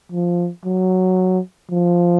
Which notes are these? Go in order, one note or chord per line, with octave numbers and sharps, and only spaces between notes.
F3
F#3
F3